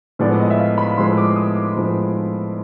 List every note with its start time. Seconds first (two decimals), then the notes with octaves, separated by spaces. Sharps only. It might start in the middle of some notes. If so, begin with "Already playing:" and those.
0.19 A2 F3 G#3 B3 D5
0.40 D#5
0.50 E5
0.59 F5
0.78 B5
0.97 A2 F3 G#3 B3 C6
1.18 D6
1.36 D#6
1.55 D6
1.76 A2 F3 G#3 B3